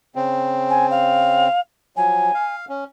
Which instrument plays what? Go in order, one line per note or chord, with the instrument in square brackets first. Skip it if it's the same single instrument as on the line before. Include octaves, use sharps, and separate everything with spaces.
[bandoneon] C#3 C4
[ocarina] G#5
F5
[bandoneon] F3 F#3 [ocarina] G#5
[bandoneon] F5
C#4